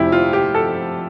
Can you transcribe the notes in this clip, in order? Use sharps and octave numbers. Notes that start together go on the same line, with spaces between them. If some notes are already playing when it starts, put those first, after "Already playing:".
Already playing: F1 F2 C3 E4 G4
F4
G4
A4